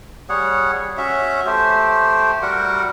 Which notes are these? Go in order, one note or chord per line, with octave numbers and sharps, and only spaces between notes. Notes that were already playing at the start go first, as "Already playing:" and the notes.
G3 G#4 C#5 F#5
C#4 F#4 E5
A3 G4 C5
G3 F#4 A#4 F#5